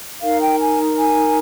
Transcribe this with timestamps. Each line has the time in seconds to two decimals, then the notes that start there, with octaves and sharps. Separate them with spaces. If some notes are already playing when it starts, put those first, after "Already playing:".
0.21 D#4 A#4 F5
0.40 G5
0.58 G#5
0.96 G#5